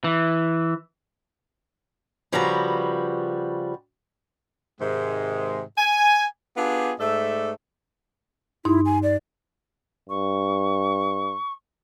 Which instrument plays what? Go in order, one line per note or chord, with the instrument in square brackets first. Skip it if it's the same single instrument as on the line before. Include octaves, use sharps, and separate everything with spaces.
[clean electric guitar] E3
[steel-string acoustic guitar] C#3 F3 G3 F#4 B4 A#5
[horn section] G#2 C3 D#3 G#3
G#5
B3 D4 F4 G4 G#4
G#2 A3 A4 D5 E5
[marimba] G2 D#4 C6 [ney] E4
[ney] G#5
D5
[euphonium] G2 [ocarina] C#6